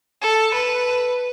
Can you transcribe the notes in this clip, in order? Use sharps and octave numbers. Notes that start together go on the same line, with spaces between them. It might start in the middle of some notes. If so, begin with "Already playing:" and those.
A4
B4